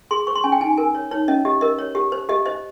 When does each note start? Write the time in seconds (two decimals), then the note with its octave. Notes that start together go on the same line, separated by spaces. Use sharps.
0.11 G#4 C6
0.27 C5 C#6
0.35 C6
0.44 C#4 G#5
0.52 G5
0.61 D#4 G#5
0.78 A#4 G#5
0.95 C#5
1.11 D#4 C#5
1.28 C#4 D#5
1.45 G4 D#5
1.61 A#4 D#5
1.79 C#5
1.95 G4
2.12 C5
2.29 G4 D#5
2.46 C5 D#5